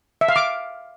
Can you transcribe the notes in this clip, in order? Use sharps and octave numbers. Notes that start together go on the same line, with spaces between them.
E5
F5
D6